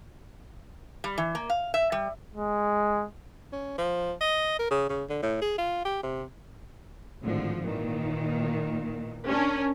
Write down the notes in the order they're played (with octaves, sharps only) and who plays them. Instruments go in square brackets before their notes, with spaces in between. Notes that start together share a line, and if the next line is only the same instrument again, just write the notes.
[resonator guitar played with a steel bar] G3
E3
A#3
F5
E5
G3
[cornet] G#3
[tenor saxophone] C#4
F3
D#5
A#4
C#3
C#3
D3
A2
G#4
F4
G4
C3
[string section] G#1 A2 D3 F3
A#2 D#3 E3
C#4 D4 A#4